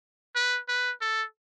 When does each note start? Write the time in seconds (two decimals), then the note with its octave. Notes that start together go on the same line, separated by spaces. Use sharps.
0.36 B4
0.68 B4
1.01 A4